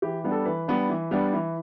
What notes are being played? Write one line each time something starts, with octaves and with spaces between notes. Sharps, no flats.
E3 G4
G3 B3 D4
A4
E3 B4
G3 B3 D4
E3
G3 B3 D4
E3